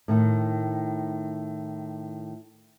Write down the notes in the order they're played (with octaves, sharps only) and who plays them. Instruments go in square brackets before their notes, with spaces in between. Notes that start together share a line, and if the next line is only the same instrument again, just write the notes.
[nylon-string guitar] A2 D#3